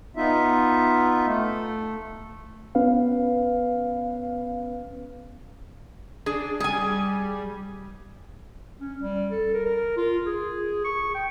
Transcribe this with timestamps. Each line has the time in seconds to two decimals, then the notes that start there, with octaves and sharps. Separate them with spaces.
0.16 B3 D#4 F4 E5
1.26 A3
2.75 B3 C#4 B4 F5
6.26 D4 G#4
6.60 G3 G#4 G#5
8.81 C#4
9.00 G3
9.31 A4
9.54 A#4
9.65 A#4
9.97 F4
10.26 G#4
10.85 C#6
11.14 G5